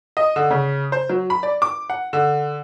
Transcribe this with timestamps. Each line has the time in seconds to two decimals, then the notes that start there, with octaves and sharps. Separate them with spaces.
0.17 D#5
0.36 D3
0.51 C#3
0.92 C5
1.09 F#3
1.30 B5
1.43 D5
1.62 D6
1.90 F#5
2.13 D3